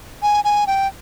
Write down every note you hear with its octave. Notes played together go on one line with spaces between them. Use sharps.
G#5
G#5
G5